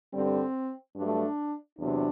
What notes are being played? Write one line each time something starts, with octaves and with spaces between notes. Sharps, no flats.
G2 D3 G3 C4
G2 F#3 A3 D4
E2 C3 F#3 D4